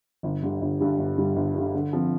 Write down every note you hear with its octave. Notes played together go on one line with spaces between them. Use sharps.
G1
G2 D3 G3
G1
G2 D3 G3
G1
G2 D3 G3
G1
G2 D3 G3
D3
F3 C4